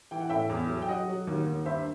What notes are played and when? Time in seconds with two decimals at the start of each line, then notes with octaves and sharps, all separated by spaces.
0.11 E3 G5
0.20 F#5
0.30 A2 E5 G5
0.49 E2
0.69 F#3
0.82 G5
0.88 F#3 D#5 F#5
1.08 F#3
1.27 D#2
1.46 D#2
1.65 G2 C5 E5